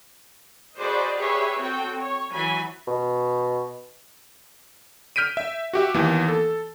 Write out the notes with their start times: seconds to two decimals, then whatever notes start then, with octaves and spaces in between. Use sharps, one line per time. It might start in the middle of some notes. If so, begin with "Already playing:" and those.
0.77 F#4 G#4 B4 C5 D5 D#5
1.17 G4 G#4 B4 C#5 E5
1.61 C4 F#4 A4 G5
1.99 C#5
2.31 E3 F#3 G#5 B5
2.87 B2
5.16 F6 G6 B6 D7 D#7
5.37 E5
5.73 F#4 G4 E5
5.94 D#2 E3 B3
6.28 A4